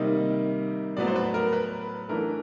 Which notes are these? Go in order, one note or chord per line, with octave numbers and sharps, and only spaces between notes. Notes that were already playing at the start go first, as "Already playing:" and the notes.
Already playing: C3 D#3 G3 A#3 D#4 D#5
A2 F#3 B3 D5
C5
B4
A#4
B4
E3 A3 D4 A#4